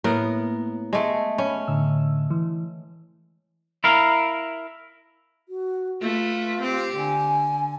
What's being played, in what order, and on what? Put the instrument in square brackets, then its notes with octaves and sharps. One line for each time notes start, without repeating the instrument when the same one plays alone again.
[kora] A2 B3 A#4 [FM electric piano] A#3
[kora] G#3 A3
[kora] C#4 [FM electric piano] B5
[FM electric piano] A2 D3 E6
E3
[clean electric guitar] E4 A#4 F5
[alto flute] F#4
[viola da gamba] A3 B4 [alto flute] F4
[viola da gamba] C4 G4
[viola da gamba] D3 [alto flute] G#5